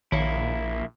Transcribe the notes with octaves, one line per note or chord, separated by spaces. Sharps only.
A#1 D#3 A#3 E4 C#5 C#7